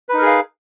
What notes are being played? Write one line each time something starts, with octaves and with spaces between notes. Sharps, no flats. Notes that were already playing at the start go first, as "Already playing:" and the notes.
D#4 G#4 A#4 B4 F5